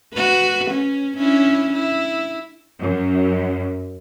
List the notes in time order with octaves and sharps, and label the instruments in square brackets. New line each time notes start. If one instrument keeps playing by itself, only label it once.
[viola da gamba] F#4 B4
C#4
C#4 D4 E4
E4
[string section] F#2